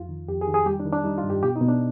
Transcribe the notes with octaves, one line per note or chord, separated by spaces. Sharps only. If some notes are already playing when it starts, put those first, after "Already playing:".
Already playing: F2 F4
D#3
F2 G4
G#4
D#3
G#4
G3 G4
D4
D#3
D4
G3 D#4
F4
G2
G4
B2 G4
D#4
B2
D4